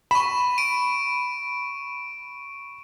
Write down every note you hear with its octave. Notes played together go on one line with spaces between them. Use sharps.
B5 C#6 E7
D7 D#7